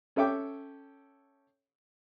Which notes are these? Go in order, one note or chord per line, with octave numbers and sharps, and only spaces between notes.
C#4 A4 E5 G5 D6